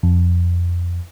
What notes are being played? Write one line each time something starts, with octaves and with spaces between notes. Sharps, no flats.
F2